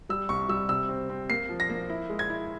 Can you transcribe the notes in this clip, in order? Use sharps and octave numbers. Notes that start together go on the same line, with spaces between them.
G3 E6
C2 C#6
G3 E6
C3 E6
C4
C4
A#3 C7
F3
A#6
A#3
E4
G#3
G#6
E4